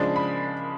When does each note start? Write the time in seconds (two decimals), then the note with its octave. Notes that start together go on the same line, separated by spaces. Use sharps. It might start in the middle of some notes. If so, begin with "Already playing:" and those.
Already playing: C#3 F3 G#3 D4
0.16 B5